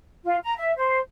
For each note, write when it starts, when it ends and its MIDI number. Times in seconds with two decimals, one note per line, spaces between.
0.24 0.36 65
0.43 0.53 82
0.57 0.72 76
0.76 0.99 72